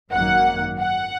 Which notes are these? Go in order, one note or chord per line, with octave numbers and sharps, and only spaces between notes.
G#1 F#2 D#3 F#3 A#3 F#5
F#5